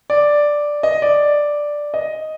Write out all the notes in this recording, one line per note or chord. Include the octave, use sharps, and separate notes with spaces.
D5
D#5
D5
D#5